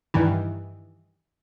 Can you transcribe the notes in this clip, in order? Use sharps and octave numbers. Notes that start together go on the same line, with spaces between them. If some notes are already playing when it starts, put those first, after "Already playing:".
G2 D#3 E3